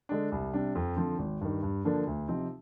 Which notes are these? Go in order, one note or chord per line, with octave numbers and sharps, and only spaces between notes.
D3 G#3 D4
C2
C3 G3 D4
F2
D3 F3 C4
G#1
G2 D#3
G2
D3 F3 A#3 D4
D2
C3 F3 C4 D#4